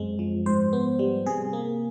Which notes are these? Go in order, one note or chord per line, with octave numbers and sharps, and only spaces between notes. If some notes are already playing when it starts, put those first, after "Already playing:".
Already playing: F#2 G#3 C4
F3
G#2 C5
B3
G3
C3 G#4
A#3